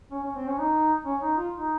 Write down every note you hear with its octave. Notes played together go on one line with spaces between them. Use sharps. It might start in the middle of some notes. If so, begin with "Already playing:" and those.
C#4
C#4
C4
C#4
D#4
C#4
D#4
F4
D#4